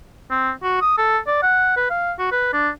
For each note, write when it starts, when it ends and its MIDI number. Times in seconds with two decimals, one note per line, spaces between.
0.31 0.51 60
0.63 0.78 66
0.82 0.98 87
0.98 1.18 69
1.27 1.41 74
1.42 1.75 78
1.77 1.87 71
1.90 2.12 77
2.19 2.31 66
2.32 2.51 71
2.53 2.69 62